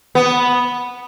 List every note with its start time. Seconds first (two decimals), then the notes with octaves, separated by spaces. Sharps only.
0.15 B3